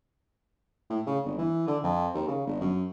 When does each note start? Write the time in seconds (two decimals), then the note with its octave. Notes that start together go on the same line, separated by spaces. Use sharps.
0.90 A2
1.06 C#3
1.25 G1
1.38 E3
1.68 D3
1.84 F2
2.14 D#2
2.28 C#3
2.47 G1
2.61 F#2